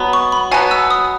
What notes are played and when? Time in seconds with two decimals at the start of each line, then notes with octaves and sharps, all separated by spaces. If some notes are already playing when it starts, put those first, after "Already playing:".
Already playing: B2 F#3 B3
0.13 C#6
0.32 B5
0.51 B2 F#3 B3 G#5
0.71 E6
0.90 D#6